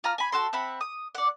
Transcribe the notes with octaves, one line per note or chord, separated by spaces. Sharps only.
F4 A#5 F6
G#5 B5
F#4 A4 C6
C4 E5 F#5 B5
D#6
D5 F#5